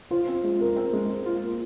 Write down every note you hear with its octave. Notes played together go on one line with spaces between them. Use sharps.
F4 C5
C4
G#3
G#3 A#4
C4
G#3
C5
F4
A#3